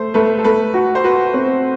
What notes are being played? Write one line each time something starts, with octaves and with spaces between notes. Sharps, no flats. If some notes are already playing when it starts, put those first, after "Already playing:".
Already playing: A3 C5
A3 B4
A4
A3 B4
F#4
C5
F#4 B4
C4